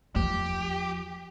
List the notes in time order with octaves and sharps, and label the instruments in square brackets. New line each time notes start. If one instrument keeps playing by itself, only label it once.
[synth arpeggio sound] E2 [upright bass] F3 [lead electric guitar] G4